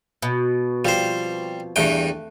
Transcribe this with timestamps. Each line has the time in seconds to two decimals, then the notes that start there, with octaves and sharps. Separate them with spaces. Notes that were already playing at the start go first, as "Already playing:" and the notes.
0.22 B2
0.85 F3 G3 C4 C5
1.76 E2 G2 A3 F#5 G5